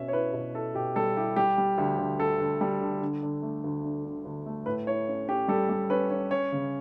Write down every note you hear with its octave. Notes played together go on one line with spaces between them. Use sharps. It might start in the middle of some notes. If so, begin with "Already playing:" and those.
Already playing: B2 C#4 E5
C#5
E4 B4
B2
E4 A4
B2 G4
G3 A4
E4 G4
G3 G4
G3
D2
D2
D2 A4
D2
G3
D3
D3
D3
A3
D2
D4
D3
D2
A3
A2 B4
E4 C#5
C#4
C#4 G4
G3 A4
G3
C#4 B4
C#4
C#4 C#5
C#3